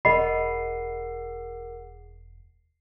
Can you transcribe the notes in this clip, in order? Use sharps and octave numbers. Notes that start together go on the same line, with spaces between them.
E1 G#4 A#4 D#5 F#5 B5 C7